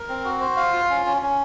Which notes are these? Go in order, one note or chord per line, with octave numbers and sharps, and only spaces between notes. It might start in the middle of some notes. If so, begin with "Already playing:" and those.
Already playing: A#4
C4
F#4
C5
F5
F4
C#4
C#4
C#4